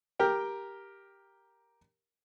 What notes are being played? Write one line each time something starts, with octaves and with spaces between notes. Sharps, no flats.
G4 A#4 G5